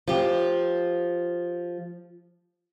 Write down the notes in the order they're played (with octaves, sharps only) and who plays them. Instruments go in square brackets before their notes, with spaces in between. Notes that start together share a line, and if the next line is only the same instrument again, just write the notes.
[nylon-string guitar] F3 G4